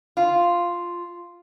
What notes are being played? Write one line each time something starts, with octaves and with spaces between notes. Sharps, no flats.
F4